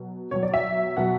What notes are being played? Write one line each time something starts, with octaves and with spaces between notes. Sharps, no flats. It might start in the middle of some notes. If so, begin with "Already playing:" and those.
Already playing: B2 F#3
B2 F#3 C#5
D5
E5
B2 F#3 F#5